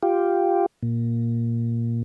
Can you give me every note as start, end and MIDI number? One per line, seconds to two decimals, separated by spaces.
0.03 0.66 65
0.03 0.66 67
0.83 2.03 46